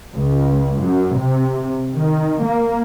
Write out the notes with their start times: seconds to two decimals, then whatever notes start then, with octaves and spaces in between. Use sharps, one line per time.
0.16 C#2
0.81 F#2
1.17 C3
1.96 D#3
2.44 A#3